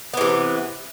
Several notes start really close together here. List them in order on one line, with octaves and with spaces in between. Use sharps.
B3 E3 C3